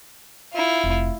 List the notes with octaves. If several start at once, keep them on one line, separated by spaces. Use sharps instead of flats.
E4 F4
F1